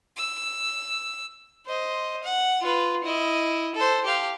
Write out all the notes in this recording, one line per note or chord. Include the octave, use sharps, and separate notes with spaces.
E6
C5 D#5
F#5
F4 B4
E4 D#5
A4 C5
G4 F5